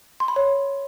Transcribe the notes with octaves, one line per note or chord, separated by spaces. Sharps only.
C6
B5
C#5